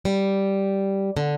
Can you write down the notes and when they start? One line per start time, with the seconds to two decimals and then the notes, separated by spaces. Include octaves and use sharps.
0.05 G3
1.17 D3